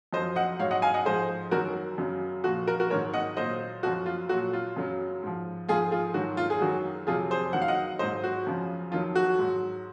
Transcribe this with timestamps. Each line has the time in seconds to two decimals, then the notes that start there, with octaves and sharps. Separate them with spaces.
0.13 F#2 F3 C5 D#5
0.36 D#5 F#5
0.59 G#2 F#3 C#5 F5
0.71 D#5 F#5
0.82 F5 G#5
0.94 D#5 F#5
1.05 G#2 F3 G#4 C5
1.51 F#2 D#3 F#3 F#4 A#4
1.98 F#2 C#3 F#3
2.44 A#2 F3 F#4
2.67 F#4 A#4
2.80 F#4 A#4
2.90 G#2 D#3 F#3 A#4 C#5
3.14 D#5 F#5
3.37 A#2 F#3 C5 D#5
3.83 F#2 F3 F#4
4.06 F4
4.29 A#2 F#3 F#4
4.53 F4
4.76 F#2 C#3 F#3
5.23 G#2 F3
5.69 G#2 F3 F4 G#4
5.91 F4 G#4
6.14 G#2 D#3 F#3 F#4
6.37 F4
6.50 G#4
6.60 F#2 D#3 F#3 F#4
7.07 F2 C3 F#3 F4 G#4
7.31 G#4 C5
7.53 F#2 D#3 F#3 F#5
7.62 F5
7.68 D#5 F#5
7.99 F#3 C5 D#5
8.02 G#2
8.24 F#4
8.47 F#2 C#3 F3
8.92 F2 D#3 F#3 F4
9.15 F#4
9.39 G#2 F#3